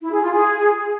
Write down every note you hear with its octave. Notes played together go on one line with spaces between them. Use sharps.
E4
G#4
F4
G#4